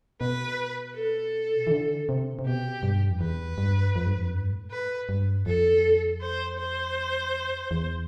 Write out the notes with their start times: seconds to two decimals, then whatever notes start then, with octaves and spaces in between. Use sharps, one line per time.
0.21 B2 B4
0.96 A4
1.67 E3
1.71 D3
2.09 C3
2.39 C3
2.46 B2 G4
2.83 G2
3.10 F2
3.21 E2 B4
3.58 G2
3.96 F2
4.06 G2
4.15 F2
4.34 G2
4.52 A2
4.71 B4
5.09 G2
5.46 F2 A4
6.21 C5
6.59 C5
7.71 E2